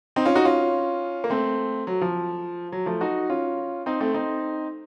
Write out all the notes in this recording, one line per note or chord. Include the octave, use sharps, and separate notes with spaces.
C4 D#4
C#4 F4
D#4 F#4
C#4 F4
A#3
A3 C4
F#3
F3
F#3
F3 A3
D#4 F#4
C#4 F4
C4 D#4
A3 C4
C4 D#4